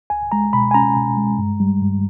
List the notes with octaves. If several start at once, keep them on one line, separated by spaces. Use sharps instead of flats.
C#2 G#5
G#3 A#5
B2 B5
G#5
C#4 A#5
B2
G#3
G2
G3
G2